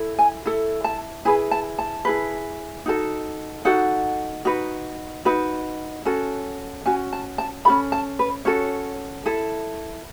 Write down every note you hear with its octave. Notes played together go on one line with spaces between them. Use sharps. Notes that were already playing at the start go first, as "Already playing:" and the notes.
Already playing: E4 A4
G#5
E4 A4
A5
E4 G#4 B4 G#5
A5
A5
E4 G#4 B4
D#4 F#4 A4
D#4 F#4 A4 F#5
D#4 F#4 B4
D#4 F#4 B4
C#4 F#4 A4
C#4 F#4 G#5
A5
A5
C#4 F#4 A4 B5
A5
B4
C#4 F#4 A4 C#5
E4 A4